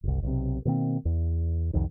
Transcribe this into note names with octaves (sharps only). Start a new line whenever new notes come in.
F#1 C2
B1 C3
B2 D#3 A#3 C4
E2
C2 F2 D#3